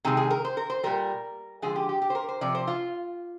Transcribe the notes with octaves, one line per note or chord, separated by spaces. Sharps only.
C3 D#3 G#3 G#4
G#4
A#4
C5
A#4
C5
A#2 G3 A#4
D3 F3 G#3 G#4
G4
G4
G4
C5
A#4
C5
C3 F3 D5
C5
F4